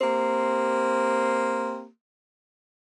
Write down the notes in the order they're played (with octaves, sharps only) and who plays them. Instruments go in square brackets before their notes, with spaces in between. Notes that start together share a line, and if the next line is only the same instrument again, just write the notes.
[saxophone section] A#3 C4 G4